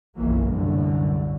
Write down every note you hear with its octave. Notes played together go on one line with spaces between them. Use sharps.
F#1 B1 E3 F#3 A#3
C2 F#2 A2 D3